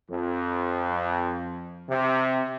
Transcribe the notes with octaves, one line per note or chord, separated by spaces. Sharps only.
F2
C3